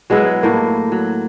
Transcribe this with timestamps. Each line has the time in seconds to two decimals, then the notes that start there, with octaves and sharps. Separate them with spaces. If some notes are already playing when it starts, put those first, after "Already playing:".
0.10 F#3 G#3 B3 E4
0.43 A2 A#3
0.92 F#3